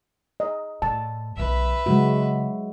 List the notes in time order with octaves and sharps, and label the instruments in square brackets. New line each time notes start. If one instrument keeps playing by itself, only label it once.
[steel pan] D#5
[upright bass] A2 [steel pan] A5
[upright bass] B1 F3 [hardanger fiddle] B4 E5
[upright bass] C#3 [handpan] F#3 G#3 F#4